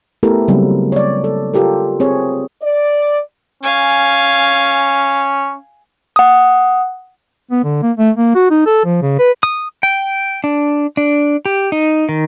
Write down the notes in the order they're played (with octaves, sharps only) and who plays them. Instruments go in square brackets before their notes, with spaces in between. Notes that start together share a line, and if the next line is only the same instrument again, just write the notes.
[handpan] A3 B3 E4 G4 A4 A#4
C#3 F#3 G3 A#3 C4
C#5 D5
A4
F4 G4 A4 A#4
C4 G#4 C#5
[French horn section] D5
[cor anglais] C#4 [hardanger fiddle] F5 G#5
[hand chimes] F#5 D#6
[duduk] B3
D3
A#3
A3
A#3
F#4
D#4
A4
F3
C#3
B4
[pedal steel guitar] D#6
G5
D4
D4
G4
D#4
D#3